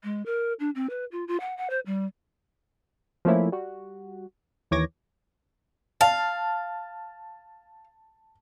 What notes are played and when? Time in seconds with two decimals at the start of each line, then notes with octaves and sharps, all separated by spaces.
0.04 G#3
0.26 A#4
0.60 D4
0.75 C4
0.90 B4
1.12 F4
1.28 F4
1.40 F#5
1.57 F#5
1.70 C5
1.86 G3
3.25 F3 A3 A#3 C#4 E4
3.52 G3 F#4
4.71 D#2 E3 C#5 D6 G#6 A#6
6.01 F5 A5